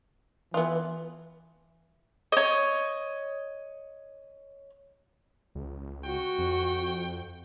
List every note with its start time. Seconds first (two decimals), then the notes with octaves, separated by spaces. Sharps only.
0.54 E3 B3 F4
2.32 C#5 D#5
5.55 C#2
6.05 F#4 G5 C#6
6.38 F2